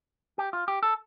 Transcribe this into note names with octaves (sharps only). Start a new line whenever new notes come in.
G4
F4
G4
A4